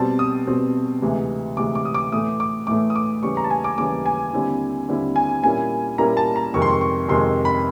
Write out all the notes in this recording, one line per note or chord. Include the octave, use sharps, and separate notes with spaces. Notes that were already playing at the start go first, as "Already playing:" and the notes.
Already playing: B2 G3 C4 A5
D#6
B2 G3 C4
D2 C3 E3 G#3
D2 C3 E3 G#3 D6
D6
D#6
D6
A2 E3 A3 D#6
D6
A2 E3 A3 D6
D#6
D6
D#2 C#3 E3 G3 C#6
A#5
A5
G#5
D6
D#2 C#3 E3 G3 D6
G#5
D#2 D3 G3 C4 E4
D#2 D3 G3 C4 E4
G#5
A#2 G3 A#3 C#4 E4 G#5
A#2 G3 A#3 C#4 E4 A#5
A5
A#5
F2 C3 D#3 G#3 C#6
C6
C#6
C#6
F2 C3 D#3 G#3 C6
B5